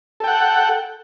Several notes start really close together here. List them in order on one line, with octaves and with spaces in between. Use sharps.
A4 G5 F#5